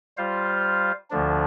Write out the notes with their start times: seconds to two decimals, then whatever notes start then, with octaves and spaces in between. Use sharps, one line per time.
0.17 G3 F4 C5 F5
1.11 D2 D3 F3 D4